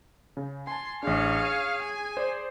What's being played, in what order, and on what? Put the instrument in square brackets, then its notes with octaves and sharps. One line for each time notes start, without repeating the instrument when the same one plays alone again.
[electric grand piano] C#3
[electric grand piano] G#5 A5 [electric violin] C6
[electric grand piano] A1 D4 [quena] G#4 [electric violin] C#5 F5
[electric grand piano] D#7
[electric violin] G#5
[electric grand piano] C5 D5